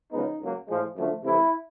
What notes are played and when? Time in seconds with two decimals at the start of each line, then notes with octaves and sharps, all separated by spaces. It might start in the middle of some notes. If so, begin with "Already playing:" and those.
0.12 F#2 C#3 F3 G#3 B3 D#4
0.40 C#2 C#3 F#3 A#3
0.68 A2 F3 G#3
0.96 F#2 D3 F3 A3
1.24 C2 C3 E3 A3 E4